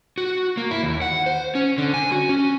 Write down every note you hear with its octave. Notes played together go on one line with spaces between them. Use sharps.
F#4
A#3
E4
D#2
F#5
C5
C#4
D3
G#5
F#4
C#4